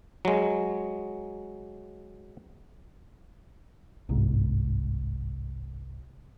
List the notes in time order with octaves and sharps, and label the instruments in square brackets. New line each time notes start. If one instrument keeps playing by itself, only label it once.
[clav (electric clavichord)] F#3 G#3
[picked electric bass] G1 C2 G#2